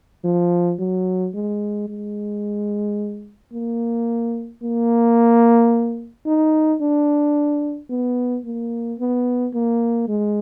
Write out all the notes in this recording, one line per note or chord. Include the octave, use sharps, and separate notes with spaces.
F3
F#3
G#3
G#3
A#3
A#3
D#4
D4
B3
A#3
B3
A#3
G#3